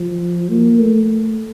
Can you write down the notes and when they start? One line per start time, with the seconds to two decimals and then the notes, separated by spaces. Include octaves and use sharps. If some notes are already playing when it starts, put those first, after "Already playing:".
Already playing: F3
0.49 A#3
0.79 A3